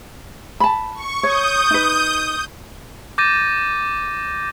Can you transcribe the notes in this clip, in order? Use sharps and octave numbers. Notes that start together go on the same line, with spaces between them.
A5 B5
C#6
C#5 D#6 G6
D#4 B4
D6 G6 A6 A#6 D#7